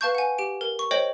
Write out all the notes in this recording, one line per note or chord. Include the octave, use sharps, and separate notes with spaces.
B4 F5 A5 C#6 G6
F#5 G#5
G4 D7
A#4
C#6
C5 C#5 D#5 G5 F#7